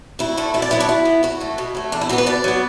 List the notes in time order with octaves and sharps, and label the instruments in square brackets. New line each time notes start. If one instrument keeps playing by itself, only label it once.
[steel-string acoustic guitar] D2 E4
D3 A3
B2 E4
D5
F#3 B3 E4
D4
B2 E4
B3
E2 F#4
E3 A3
B2
F#3 A3
E2 D4
E4
E3 B3 F#4
B4
B2 D5
F#3 B3